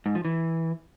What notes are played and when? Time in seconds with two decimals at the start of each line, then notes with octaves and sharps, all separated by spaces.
0.06 G#2
0.15 F3
0.25 E3